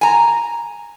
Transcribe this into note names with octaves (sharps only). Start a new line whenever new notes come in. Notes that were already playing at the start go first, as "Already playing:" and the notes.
G#5 A#5